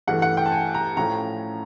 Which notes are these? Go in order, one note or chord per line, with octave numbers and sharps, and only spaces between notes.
G2 E3 A3 F#5
F#5
G5
A5
G#5
A#5
A2 F3 A3 C#4 F4 A#5